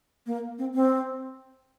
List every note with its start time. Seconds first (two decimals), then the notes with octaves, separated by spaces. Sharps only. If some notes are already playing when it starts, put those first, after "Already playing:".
0.26 A#3
0.58 C4
0.75 C4